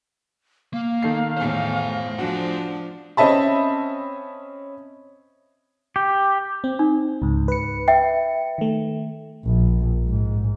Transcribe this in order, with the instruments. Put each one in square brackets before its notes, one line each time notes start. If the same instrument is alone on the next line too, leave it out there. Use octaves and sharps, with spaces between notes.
[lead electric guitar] A#3 [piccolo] F5
[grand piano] D#3 A4 C7
[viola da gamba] E2 A2 [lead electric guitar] C5 G#5
[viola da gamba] F3 D4 [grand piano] F#4 F#5
[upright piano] C4 C#4 D#5 E5 A5 B5
[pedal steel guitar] G4
[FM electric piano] C4
[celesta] D#4
[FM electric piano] C#2 G#2
B4 C#7
[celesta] E5 G5
[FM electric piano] D#3 A3
[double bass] A#1
G#2